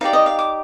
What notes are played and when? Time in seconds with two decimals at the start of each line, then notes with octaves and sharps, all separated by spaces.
0.01 D#4 G4 D5 F5
0.13 D#5
0.26 F5
0.39 D6